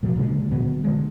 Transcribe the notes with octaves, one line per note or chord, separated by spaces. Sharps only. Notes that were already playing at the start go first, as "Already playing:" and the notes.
A#2 F3 F#3
C#2 A#2 D3 G#3
A#2 D3 F#3 B3
D3 G#3